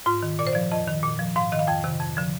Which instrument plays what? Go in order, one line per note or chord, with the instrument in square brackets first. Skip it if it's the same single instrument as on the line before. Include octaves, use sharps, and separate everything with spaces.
[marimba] G#2 F4
D#3
A#2 D5
C5
F3 D5
F2 D#5
D#3
A#2
F3
G#2 F5
D#3 D#5
F5
F2 G5
C3 D#3
F2
D3 F3